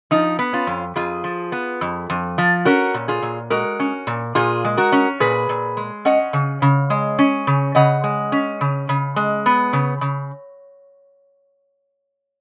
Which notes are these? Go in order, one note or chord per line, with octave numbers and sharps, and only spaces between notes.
F3 D#4
B3
C#4 F4
F2
F2 F4 G#4
F3
B3
F2
F2
F3
C#4 F#4 A#4
A#2
F4 G#4
A#2
G#3 F#4 A#4
C#4
A#2
A#2 F4 G#4
G#3
F#4 A#4
C#4
A#2 G#4 B4
A#2
G#3
C#4 D#5 F#5
C#3
C#3
G#3
C#4
C#3
C#3 D#5 F#5
G#3
C#4
C#3
C#3
G#3
B3
C#3
C#3